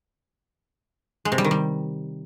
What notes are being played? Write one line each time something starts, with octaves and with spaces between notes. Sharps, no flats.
G#3
C3
G3
D#3
G3